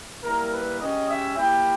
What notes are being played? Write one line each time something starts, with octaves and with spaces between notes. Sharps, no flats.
G3 A#3 E4 A#4
B4
G#3 C#4 G4 D#5
E5
A#3 E4 G4 G5